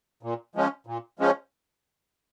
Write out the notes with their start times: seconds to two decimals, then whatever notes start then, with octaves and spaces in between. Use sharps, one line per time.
0.23 A#2
0.55 F3 G#3 C#4
0.87 A#2
1.19 F3 G#3 C#4